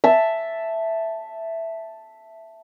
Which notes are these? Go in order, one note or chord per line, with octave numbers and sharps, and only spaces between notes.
E5 A5